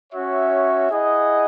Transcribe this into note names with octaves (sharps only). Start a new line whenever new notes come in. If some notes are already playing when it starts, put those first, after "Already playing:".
C#4 F#4 C#5 E5
E4 G#4 D#5 F#5